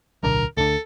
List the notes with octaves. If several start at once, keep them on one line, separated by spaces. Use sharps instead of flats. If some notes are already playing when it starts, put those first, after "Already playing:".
D1 B1 D3 A#4
D2 D3 A4